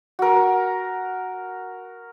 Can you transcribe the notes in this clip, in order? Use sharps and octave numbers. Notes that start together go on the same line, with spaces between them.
F#4 A#4